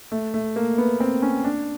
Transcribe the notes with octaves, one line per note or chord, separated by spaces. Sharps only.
A3
A3
A#3
B3
C4
C#4
D4